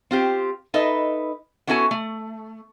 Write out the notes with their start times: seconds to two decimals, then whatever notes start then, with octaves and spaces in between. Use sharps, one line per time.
0.11 C4 F4 G4 C5
0.74 D#4 A4 B4 D#5 E5
1.67 B3 C#4 E4 F#4 A4 G#5
1.91 A3